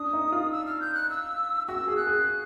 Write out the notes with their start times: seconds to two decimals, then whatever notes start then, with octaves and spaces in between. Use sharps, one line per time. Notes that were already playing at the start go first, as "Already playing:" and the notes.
Already playing: D4 D#6
0.13 D#4
0.32 F4
0.52 E6
0.66 F6
0.81 G6
0.94 F#6
1.10 E6
1.67 F#4 E6
1.88 G#4
1.97 F#6
2.07 G#4